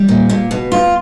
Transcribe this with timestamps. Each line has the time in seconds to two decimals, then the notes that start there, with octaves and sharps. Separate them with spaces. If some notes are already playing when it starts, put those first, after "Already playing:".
Already playing: G3
0.09 A#2
0.29 A#2
0.51 B2
0.72 F4